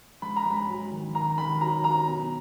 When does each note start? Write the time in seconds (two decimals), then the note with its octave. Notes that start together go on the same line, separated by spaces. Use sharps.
0.22 G#2 B5
0.36 A#5
0.46 G#2 B5
0.69 F#3
0.92 D#3
1.15 D#3 A#5
1.38 D#3 B5
1.61 F#3 A#5
1.84 F#3 A#5
2.08 B2